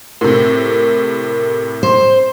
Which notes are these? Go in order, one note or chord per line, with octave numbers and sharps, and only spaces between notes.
A2 C3 A#4
C5